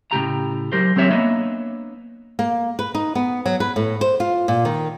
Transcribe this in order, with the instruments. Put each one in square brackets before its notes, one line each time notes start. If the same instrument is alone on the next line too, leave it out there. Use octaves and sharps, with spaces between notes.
[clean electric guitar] A2 C#3 G4 A#5
F#3 G4 A#4 C5
F#3 C4 G4 C#5 E5
A#3 B3 D4 C#5 D#5 E5
[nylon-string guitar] A#3
B4
D#4
B3
F#3
B4
A2
C5
F4
A#2
D#3